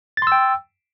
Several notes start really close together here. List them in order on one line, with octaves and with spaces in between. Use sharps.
A6 C6 E6 G5